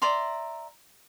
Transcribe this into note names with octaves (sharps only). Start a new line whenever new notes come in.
D5 E5 A#5 C6